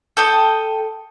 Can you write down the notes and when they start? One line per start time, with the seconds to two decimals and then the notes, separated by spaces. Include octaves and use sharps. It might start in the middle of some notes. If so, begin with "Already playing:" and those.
0.17 A4 G5 D#6